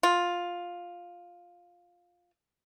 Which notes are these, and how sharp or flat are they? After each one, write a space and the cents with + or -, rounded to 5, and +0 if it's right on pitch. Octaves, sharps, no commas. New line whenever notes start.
F4 +10